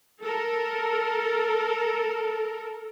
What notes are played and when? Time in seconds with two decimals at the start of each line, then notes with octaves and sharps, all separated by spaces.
0.22 A4 A#4